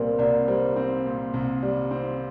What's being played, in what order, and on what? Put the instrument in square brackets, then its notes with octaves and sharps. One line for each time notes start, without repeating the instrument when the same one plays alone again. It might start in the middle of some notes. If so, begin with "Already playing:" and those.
Already playing: [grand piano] C2 A#2 G3 C4 [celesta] A#4 D5
[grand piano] C2 [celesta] D5
[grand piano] G3 [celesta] C5
[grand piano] C4
A#2
C2
[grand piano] G3 [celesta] D5
[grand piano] C4